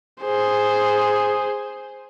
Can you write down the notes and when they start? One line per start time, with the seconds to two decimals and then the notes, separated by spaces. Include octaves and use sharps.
0.23 G#4 C5